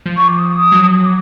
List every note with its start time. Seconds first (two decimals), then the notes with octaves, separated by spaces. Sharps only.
0.06 F3
0.17 C#6
0.28 D6
0.39 D#6
0.72 F#3
0.92 D#6
1.06 D6